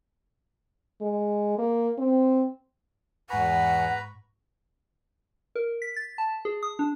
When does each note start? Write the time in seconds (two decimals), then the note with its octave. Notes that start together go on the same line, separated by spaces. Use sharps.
1.01 G#3
1.58 A#3
1.98 C4
3.30 E2 G#2 B4 F#5 G#5 A#5 B5 C#6
5.55 A#4
5.82 B6
5.96 A6
6.18 A5
6.45 G#4
6.63 D#6
6.79 D4